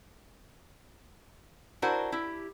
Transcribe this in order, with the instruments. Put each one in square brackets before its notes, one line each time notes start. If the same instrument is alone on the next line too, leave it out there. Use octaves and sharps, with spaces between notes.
[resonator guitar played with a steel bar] D4 E4 F#4 A#4 C5 F#5
E4 G4